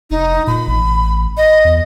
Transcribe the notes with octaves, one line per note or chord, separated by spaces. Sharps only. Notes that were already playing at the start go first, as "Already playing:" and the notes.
F1 D#4
A#2 B5
A1
D#5
E2